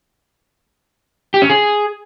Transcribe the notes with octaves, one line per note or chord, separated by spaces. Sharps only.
G4
C#4
G#4